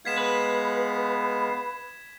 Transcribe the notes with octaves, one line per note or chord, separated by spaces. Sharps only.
G#3 B3 F5 G#6 B6 E7
B4